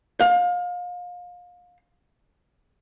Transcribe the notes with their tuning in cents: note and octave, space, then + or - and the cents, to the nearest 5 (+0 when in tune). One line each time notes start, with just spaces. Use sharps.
F5 +30